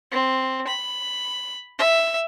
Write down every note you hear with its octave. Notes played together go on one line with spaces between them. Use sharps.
C4
B5
E5